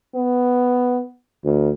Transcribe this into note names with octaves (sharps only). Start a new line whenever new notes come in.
B3
D2